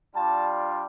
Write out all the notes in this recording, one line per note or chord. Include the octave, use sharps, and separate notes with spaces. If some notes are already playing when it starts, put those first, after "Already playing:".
G3 D4 F4 A5